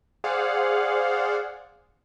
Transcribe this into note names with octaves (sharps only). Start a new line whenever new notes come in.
G#4 C5 D5 F5 F#5